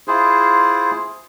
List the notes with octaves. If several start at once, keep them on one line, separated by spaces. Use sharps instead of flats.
E4 F4 G#4 C5